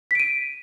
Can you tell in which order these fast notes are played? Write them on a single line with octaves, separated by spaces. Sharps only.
B6 D7 D#7